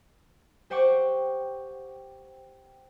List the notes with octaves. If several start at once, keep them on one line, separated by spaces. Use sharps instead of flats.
G4 C5 F#5 G5 C#6 D6